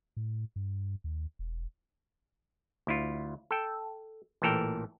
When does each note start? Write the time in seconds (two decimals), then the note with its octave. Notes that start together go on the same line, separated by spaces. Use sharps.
0.17 A2
0.56 G2
1.04 D#2
1.39 E1
2.87 D2 E4 F4
3.51 A4 G5
4.42 A1 A#2 E3 A4 A#4 G5